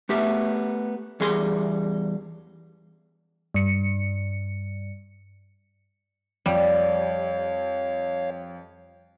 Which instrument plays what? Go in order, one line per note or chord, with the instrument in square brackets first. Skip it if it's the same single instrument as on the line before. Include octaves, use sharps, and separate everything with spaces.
[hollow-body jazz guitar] A3 B3 G4 E5
E2 G3 G#4 C6
[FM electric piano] G2 C#7
[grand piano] F2 [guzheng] G3 [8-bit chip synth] C#5 F5